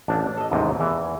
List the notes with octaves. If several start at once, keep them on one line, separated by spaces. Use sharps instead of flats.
A1 D4
A4 D#5
A1 D#2 G#2 C3
E2 E3